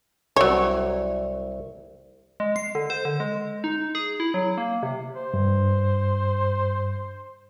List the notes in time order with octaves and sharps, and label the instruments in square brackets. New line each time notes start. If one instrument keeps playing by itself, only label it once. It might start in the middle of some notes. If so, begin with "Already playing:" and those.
[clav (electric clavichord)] C2 [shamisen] F#3 C#5
[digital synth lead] G#3
C7
D3
C5
D3
G#3
D#4
G#4
E4
F#3
A#3
C3
[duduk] C5
[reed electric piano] G2